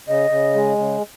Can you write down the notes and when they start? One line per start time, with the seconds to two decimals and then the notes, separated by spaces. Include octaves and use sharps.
0.08 C#3 D#5
0.30 C#3
0.55 G#3
0.78 C#3